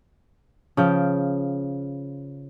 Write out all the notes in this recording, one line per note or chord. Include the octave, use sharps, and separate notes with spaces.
C#3 F3 G5